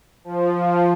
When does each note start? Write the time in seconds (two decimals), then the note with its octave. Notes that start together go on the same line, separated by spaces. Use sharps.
0.24 F3
0.54 F3